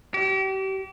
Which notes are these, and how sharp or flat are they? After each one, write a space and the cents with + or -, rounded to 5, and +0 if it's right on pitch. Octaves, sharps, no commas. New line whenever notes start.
G4 -35